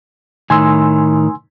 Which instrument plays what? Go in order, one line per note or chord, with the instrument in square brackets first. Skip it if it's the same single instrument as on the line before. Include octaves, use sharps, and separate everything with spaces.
[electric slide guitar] A2 D#3 [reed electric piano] G#5 C6 E6